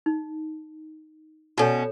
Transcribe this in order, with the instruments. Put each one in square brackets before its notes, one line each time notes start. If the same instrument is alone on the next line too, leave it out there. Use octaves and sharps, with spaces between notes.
[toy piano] D#4
[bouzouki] B2 C#4 [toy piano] F#4 A4 C#5